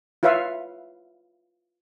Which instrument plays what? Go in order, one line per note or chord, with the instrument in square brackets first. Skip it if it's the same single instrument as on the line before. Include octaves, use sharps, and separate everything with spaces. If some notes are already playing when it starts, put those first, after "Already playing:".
[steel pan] E4 F4 B4 C#5 E5 F5